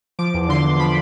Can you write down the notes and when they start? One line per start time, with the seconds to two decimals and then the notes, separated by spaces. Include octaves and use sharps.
0.19 F3 D6
0.34 E2
0.49 D3 C6
0.64 E2
0.79 F3 B5